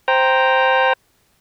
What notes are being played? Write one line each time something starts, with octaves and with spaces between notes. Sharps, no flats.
C5 G5 A#5